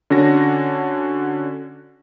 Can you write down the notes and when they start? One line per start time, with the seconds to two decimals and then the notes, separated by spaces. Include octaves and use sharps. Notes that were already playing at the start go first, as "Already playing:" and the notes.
0.10 D3 C#4 D4 F#4 A#6